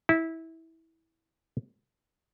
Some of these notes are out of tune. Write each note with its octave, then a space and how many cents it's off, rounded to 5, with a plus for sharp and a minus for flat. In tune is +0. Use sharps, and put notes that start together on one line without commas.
E4 -20